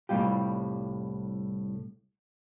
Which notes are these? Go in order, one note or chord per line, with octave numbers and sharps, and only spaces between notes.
C2 A2 C#3 G3 F4 G4